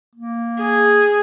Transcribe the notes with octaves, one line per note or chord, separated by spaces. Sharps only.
A#3
G#4